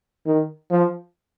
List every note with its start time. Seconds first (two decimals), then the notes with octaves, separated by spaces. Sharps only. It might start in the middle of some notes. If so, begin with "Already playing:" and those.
0.26 D#3
0.70 F3